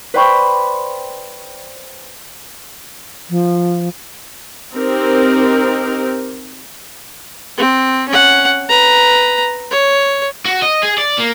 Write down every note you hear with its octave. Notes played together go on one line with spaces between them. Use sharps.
B4 C5 D5 G5 B5 C#6
F3
C4 D#4 G4 A#4
C4
C#4 F#5
B4 A#5
C#5
F#4
D#5
G#4
D5
A#3